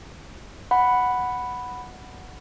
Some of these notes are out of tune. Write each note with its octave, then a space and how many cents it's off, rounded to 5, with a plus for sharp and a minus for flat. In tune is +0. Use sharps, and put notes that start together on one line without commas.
F#5 +0 B5 +0